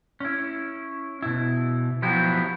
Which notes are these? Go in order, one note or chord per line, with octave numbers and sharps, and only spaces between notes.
C#4 E4
B2 E4
F3 F#3 B3 E4 G4